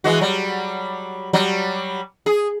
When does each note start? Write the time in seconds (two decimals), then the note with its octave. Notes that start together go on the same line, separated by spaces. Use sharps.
0.04 E3 G#3 F#4
0.21 F#3 G3
1.33 F#3 G3
2.26 G#4